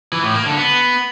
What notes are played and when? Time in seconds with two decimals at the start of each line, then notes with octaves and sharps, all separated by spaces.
0.13 E3
0.24 A2
0.35 A#3
0.46 D3
0.57 B3